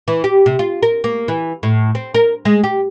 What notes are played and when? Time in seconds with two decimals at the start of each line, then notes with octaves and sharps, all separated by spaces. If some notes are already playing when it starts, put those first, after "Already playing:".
0.08 E3
0.24 G4
0.46 C3
0.59 F4
0.83 A#4
1.04 A#3
1.28 E3
1.63 A2
1.95 C4
2.14 A#4
2.45 G#3
2.64 G4